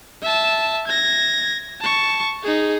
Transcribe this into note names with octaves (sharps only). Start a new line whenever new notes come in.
E5 A5
G#6 A#6
A5 C#6
D#4 G#4